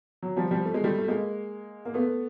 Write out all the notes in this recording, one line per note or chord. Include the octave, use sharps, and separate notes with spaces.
F#3
F3 G3
F3 G3
A3
G#3
G3 A3
A3
G#3 A#3
A#3
A3 B3